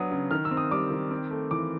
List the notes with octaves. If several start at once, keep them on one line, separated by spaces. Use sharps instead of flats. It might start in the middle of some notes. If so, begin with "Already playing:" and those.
Already playing: F#3 B3 D4 D#6
C#3
D#3 F6
E6
C4
D#6
G3 D6
D#3
C4
A3
E3 D6